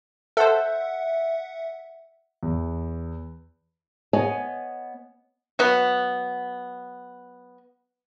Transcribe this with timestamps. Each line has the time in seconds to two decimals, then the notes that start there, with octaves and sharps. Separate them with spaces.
0.37 A4 C5 E5 F#5
2.43 E2
4.13 B3 C#5 D#5 G#5
5.59 F#3 B3